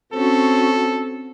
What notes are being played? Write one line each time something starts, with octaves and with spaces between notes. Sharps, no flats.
C4 C#4 F#4 A4